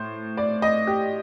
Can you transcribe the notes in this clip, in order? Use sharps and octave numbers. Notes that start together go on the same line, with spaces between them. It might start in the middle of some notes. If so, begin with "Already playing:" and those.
Already playing: A2 C5
D5
D#5
G4